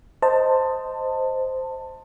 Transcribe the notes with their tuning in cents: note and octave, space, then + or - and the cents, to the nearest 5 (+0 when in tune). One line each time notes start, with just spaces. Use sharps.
C5 -5 D#5 +0 A5 +20